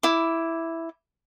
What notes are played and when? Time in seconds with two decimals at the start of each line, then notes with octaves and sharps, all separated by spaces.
0.03 E4 D6